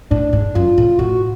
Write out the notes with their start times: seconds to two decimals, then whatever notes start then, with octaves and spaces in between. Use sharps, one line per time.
0.11 A2 D4
0.33 G#2
0.55 F#2 F4
0.78 A2
0.99 A2 F#4